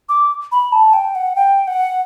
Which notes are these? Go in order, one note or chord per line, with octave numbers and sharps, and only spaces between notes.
D6
B5
A5
G5
F#5
G5
F#5